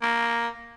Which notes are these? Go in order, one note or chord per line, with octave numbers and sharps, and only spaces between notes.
A#3